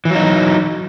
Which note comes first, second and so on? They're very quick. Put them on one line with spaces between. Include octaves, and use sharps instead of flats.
E3 F#3 D#4